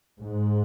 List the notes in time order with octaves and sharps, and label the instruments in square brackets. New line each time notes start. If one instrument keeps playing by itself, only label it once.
[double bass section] G#2